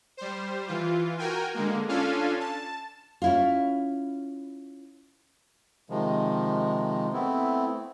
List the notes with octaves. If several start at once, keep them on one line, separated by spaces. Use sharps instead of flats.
G3 C5
E3 F4
F#4 A#4 G5 G#5
D3 G#3 A#3
C#4 D4 F4 A4 F5 G#5
A5
C#4 E4 F4
C3 D#3 F3 G#3
A3 B3 C4 E4